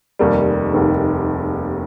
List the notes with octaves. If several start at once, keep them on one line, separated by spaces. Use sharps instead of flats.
F1 D#2 D#3 G3
F1 D#2 D#3 G3